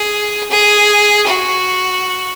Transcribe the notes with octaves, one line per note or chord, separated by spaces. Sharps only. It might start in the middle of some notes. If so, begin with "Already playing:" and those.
Already playing: G#4
G#4
F#4